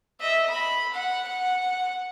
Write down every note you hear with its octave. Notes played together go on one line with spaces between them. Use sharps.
D#5 E5
B5
F#5
F#5